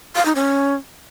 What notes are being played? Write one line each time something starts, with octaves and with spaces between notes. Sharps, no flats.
F5
D#4
C#4